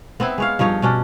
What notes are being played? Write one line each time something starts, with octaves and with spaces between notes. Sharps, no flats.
B3 C4 D#4 E4
G#3 C#5 F5
G2 F3 D#4 C#5
B2 C#4 D4